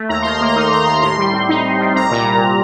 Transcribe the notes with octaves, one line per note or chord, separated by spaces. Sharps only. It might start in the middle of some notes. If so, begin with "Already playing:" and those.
Already playing: A3
D#2 A#5
D#3 C6
A#5
A#3
C6
D#4 A#5
D#2 C6
D#3 A#5
A2 C6
G3
C4
D#4
A2
G3
C2 A#5
A#2